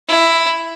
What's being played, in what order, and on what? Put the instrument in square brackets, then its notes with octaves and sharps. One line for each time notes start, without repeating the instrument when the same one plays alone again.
[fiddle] E4